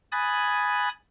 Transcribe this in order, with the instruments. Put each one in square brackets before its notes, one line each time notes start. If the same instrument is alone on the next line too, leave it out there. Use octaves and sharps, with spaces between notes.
[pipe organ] G#5 B5 D#6 F#6 G#6 A6